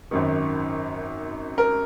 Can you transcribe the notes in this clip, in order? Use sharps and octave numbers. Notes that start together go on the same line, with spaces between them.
G#1 F#2 D#3
A#4